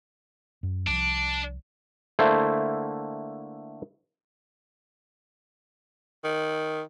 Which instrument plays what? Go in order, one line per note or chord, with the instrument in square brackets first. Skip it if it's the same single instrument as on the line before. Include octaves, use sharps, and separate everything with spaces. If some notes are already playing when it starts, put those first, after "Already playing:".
[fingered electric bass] F#2
[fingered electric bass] C2 F3 [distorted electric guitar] D4
[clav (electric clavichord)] D3 A3 A#3 E4 C5
[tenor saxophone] D#3